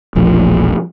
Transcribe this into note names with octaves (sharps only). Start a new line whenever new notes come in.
E1 A#1 F3 A3